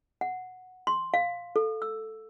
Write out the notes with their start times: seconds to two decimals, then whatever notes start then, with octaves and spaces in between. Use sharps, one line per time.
0.21 F#5
0.87 C6
1.14 F5
1.56 A4
1.82 E6